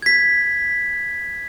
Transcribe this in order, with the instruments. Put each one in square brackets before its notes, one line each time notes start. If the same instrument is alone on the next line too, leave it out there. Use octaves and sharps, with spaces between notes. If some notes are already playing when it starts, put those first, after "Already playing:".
[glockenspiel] G#6 B6